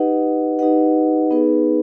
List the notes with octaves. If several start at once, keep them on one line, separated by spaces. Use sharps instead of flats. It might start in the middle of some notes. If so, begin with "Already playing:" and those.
Already playing: D#4 G4 B4 D#5 F#5
D#4 G4 B4 D#5 F#5
B3 D#4 G#4 B4